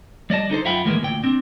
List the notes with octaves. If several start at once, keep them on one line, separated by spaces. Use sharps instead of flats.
G3 D5 D#5 A5
D3 D#4 A4 C5
F#2 F4 E5 F#5 G5 B5
A2 D#3 E3 G#3 A#3 B3
D2 A#2 G5
C4 D4